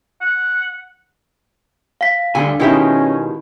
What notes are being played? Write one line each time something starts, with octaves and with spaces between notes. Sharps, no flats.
F#5
F5 B6
D2 D3 G3 G#5
B2 D#3 G#3 C#4 E4 G4 E5